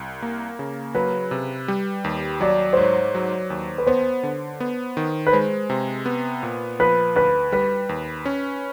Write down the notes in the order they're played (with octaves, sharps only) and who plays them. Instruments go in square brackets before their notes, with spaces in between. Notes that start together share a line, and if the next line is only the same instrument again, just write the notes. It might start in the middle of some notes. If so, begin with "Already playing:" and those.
Already playing: [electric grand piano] C2
A#3
C#3
[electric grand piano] F#3 [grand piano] B4
[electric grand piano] C3
G3
D#2
[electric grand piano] F#3 [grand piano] D5
[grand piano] C5
[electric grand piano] G#2 [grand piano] C#5
[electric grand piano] F#3
D#2
[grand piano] B4
[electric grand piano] B3 [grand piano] C5
[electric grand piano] D3
B3
D#3
[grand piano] B4
[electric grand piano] G#3 [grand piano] C5
[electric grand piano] C3
B3
A#2
[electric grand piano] F3 [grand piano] B4
[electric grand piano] D2 [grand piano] B4
[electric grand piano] G3 [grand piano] B4
[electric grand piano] D#2
C#4